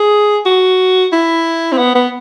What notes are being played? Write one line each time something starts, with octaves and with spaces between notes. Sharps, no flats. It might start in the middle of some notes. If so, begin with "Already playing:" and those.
Already playing: G#4
F#4
E4
C4
B3
B3